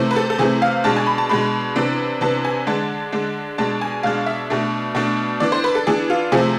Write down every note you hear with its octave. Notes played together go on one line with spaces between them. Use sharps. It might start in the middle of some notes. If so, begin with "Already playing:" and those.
Already playing: C3 E3 A3 C4
B4
A4
A4
C3 E3 A3 C4 G#4
F5
B2 G#3 D4 A5
G#5
B5
A5
B2 G#3 D4 B5
C3 E3 B3 D4
C3 E3 B3 D4 A5
G#5
D3 G#3 D4 A5
D3 G#3 D4
B2 G#3 D4 A5
G#5
B2 G#3 D4 F5
E5
B2 A3 D4
B2 A3 D4
E3 B3 D4 D5
C5
B4
A4
E3 B3 D4 G#4
F4
C3 F3 A3 C4 G#4